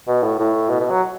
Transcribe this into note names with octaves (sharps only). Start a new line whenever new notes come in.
B2
A2
A2
B2
B2
F#3